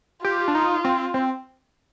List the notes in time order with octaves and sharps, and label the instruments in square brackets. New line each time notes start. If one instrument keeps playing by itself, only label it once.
[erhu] F4 [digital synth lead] G4
[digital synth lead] D4
D#4
C4
C4